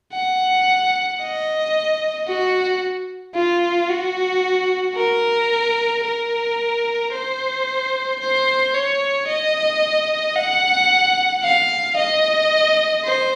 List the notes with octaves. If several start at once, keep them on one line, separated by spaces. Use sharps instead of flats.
F#5
D#5
F#4
F4
F#4
A#4
A#4
C5
C5
C#5
D#5
F#5
F5
D#5
C5